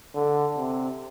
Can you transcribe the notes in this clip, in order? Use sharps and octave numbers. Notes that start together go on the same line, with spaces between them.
D3
C3